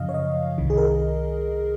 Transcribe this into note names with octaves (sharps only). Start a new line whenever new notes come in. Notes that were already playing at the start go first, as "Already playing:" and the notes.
Already playing: F#2 C#3 F3 D#5 F5
C#5
D#5
C2 C3 D#3
G#4
A#4